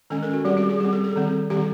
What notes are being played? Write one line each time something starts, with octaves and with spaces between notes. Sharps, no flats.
D#3 G#3 C#4 A4
A#4
F#4
G3 C4 G4
G4
G#4
G3 C4 G#4
A4
A4
D#3 G3 C4
D#3 G3 C4 G4